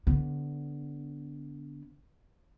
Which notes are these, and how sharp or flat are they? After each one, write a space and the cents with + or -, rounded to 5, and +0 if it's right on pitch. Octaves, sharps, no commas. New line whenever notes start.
D3 -20 B3 +0